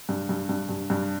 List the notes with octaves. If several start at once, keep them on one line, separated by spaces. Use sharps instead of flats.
G2
G2
G2
G2
G2